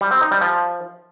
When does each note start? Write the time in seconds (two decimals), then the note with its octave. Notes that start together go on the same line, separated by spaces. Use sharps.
0.01 G3
0.11 C4
0.21 D#4
0.31 G3
0.41 F3